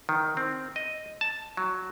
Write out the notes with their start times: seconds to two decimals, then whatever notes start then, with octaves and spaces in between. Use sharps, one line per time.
0.09 D#3
0.37 C4
0.76 D#5
1.21 A5
1.57 F#3